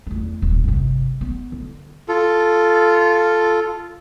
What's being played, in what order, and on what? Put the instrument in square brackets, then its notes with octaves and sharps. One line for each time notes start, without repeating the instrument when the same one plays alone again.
[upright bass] E2 A3
D#1
G1 C3
B3
D3
[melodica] F4 A4